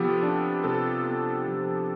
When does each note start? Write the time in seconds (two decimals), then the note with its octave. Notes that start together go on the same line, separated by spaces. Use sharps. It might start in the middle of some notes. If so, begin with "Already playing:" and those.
Already playing: C3 F3 B3 G4 A4
0.23 D4
0.64 C3 A4
1.06 B3
1.47 F3